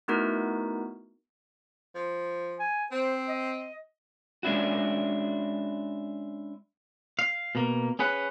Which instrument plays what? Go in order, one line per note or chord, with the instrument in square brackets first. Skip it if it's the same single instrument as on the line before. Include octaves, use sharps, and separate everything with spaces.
[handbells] A3 B3 D#4 E4 F#4 A#4
[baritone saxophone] F3
[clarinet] G#5
[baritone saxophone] C4 [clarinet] C5
[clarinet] D#5
[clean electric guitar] G#3 C#4 D4 E4 F#4
F5
B2 A#3
C#4 G#4 B4 F#5